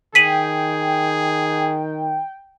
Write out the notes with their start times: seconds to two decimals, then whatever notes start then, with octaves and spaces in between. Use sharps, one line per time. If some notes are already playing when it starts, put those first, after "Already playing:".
0.15 D#3 G#4 G5 B6 D#7 F#7